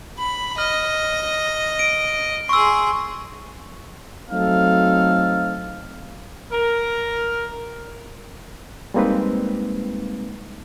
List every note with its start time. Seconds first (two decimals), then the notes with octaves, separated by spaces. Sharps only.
0.18 B5
0.58 D#5 F6
1.79 D7
2.49 G#4 C6 C#6 E6
4.29 F#3 A3 C4 D#4 A4 F5
6.52 A#4
8.94 G3 G#3 A#3 C4 D#4 B4